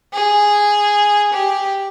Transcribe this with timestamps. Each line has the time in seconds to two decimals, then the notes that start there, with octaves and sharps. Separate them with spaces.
0.13 G#4
1.33 G4